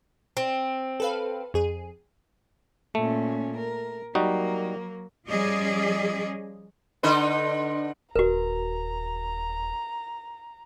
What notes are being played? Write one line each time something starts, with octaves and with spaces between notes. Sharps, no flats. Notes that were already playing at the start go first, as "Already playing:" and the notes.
C4
A4 B4 F5
F2 G#4
A#2 A3 C#4
A#4
F#3 G3 A#3 D#4 F#4
F3 G3 C#4 G#4 D5 D#5
D3 D#4 B4
D#1 F#4 A#4 B4 A#5